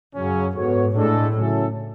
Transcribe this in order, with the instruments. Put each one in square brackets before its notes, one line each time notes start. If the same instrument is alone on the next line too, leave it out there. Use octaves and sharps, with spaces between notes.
[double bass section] F#2 [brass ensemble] C#3 F#3 C#4
[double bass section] G#2 [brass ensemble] B3 F#4 A4 C#5
[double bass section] A2 [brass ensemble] G#3 D4 A4
[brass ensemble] C#3 F#3 C#4 E4 A4